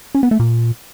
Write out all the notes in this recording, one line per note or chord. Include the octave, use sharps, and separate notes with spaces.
C#4
B3
A3
A#2